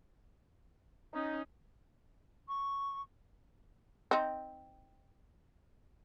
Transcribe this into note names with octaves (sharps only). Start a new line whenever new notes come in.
C#4 D#4
C#6
C4 D#4